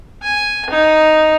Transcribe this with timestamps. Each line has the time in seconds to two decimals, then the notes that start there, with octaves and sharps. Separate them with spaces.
0.23 G#5
0.70 D#4